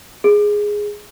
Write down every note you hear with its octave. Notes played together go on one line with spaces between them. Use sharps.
G#4